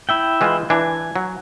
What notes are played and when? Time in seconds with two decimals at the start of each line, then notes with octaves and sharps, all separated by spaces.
0.09 E4 E5 G5
0.41 E3 G#3 F4
0.70 E3 D4 G#5
1.16 F#3